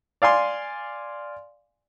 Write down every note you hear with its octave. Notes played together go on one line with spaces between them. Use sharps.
D5 F5 G#5 C6